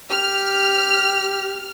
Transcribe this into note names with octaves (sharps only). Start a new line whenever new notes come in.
G4 F6